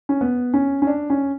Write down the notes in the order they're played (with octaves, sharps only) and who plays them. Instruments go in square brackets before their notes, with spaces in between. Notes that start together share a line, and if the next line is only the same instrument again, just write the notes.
[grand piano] C#4
B3
C#4
C#4
D4
C#4